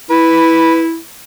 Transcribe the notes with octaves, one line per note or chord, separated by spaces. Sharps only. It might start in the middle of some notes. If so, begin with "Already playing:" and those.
E4 B4